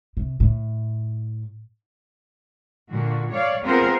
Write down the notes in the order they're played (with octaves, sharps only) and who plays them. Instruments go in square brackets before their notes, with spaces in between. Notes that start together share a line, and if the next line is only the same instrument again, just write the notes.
[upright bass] C3
A2
[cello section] A#2 D3 F#4
C#5 D5 F5
B3 C4 F4 G#4 A#4 C5